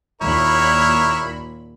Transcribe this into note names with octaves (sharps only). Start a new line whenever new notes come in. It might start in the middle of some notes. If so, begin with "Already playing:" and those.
D#2 A#2 E4 A#4 C#5 B5